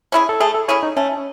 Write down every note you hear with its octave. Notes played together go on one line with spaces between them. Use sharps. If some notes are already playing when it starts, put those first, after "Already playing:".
C#4 E4 G#4
A4
A3 G#4
A4
C#4 E4 G#4 C#5
D#4
A3 C#4